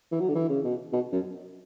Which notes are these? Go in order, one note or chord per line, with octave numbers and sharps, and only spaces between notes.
E3
F#3
D3
E3
C#3
B2
B2
F#2